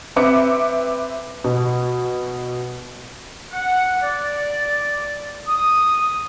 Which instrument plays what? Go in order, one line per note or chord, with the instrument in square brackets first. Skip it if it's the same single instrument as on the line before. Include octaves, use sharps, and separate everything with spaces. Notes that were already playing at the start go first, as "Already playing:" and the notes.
[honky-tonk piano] C4 B4 E5 D6 C#7
B2
[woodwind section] F#5
D5
D#6